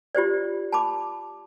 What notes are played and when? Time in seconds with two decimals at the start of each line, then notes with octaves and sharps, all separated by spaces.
0.15 F4 G4 C5 D5
0.72 A5 B5 D6